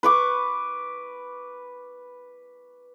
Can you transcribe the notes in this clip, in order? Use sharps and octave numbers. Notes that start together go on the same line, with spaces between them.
B4 C#6 D6